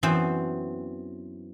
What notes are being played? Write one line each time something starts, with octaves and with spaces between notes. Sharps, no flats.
F#2 E3 B3 C4 C5 G5